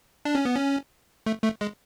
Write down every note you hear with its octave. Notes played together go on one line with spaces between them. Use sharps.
D4
C#4
B3
C#4
A3
A3
G#3